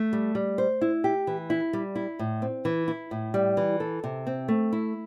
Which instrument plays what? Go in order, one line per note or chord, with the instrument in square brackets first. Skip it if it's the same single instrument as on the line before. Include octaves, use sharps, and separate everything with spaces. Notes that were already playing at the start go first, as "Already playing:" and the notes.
Already playing: [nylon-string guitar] A3
G3
G3
C5
E4
G4
E3
E4
G3
E4
A2
C4
E3
E4
A2
G3
E3
A4
C3
C4
A3
E4